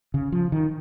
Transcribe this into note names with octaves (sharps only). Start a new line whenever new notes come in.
C#3
F3
D#3